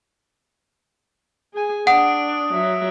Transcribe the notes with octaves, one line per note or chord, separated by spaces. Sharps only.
G#4 G#5
D4 F#5 D#6 D7
F#3 E5